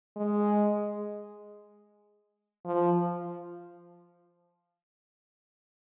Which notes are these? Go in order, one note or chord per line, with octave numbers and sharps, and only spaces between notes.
G#3
F3